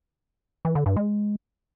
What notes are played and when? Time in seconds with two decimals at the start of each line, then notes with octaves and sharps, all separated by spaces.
0.65 E3
0.75 D3
0.86 G2
0.96 G#3